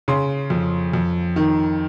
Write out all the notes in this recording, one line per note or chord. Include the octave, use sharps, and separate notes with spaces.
C#3 C6
F2
F2
D#3